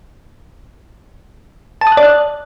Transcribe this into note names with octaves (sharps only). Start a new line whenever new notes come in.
A5
D#6
F#6
D5
F#6